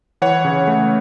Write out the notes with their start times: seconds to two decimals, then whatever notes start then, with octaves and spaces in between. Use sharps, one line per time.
0.22 E3 C#5 F#5
0.45 C#3
0.67 A3